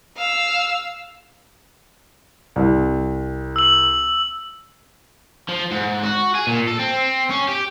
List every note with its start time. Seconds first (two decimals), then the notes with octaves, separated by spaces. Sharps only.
0.17 F5 E6
2.56 C2
3.56 E6 F#7
5.49 F3
5.71 G#2
6.03 F#4
6.35 G#4
6.47 A#2
6.68 A4
6.79 C4
7.30 C#4
7.49 G4